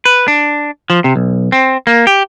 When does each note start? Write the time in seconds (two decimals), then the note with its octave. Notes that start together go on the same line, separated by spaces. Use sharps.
0.05 B4
0.28 D4
0.90 F3
1.04 C3
1.16 B1
1.52 C4
1.87 A#3
2.07 G4